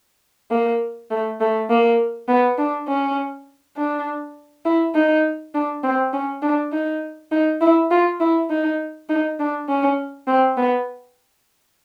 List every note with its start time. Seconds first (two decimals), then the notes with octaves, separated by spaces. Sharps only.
0.51 A#3
1.11 A3
1.41 A3
1.70 A#3
2.29 B3
2.58 D4
2.88 C#4
3.77 D4
4.65 E4
4.95 D#4
5.54 D4
5.83 C4
6.13 C#4
6.43 D4
6.72 D#4
7.32 D#4
7.61 E4
7.91 F4
8.20 E4
8.50 D#4
9.09 D#4
9.39 D4
9.69 C#4
10.28 C4
10.57 B3